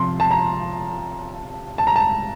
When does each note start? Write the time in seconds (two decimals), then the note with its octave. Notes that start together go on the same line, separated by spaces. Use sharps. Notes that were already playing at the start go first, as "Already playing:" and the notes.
Already playing: C3 F3 C6
0.20 A5
0.31 A#5
1.78 A5
1.87 A#5
1.96 A5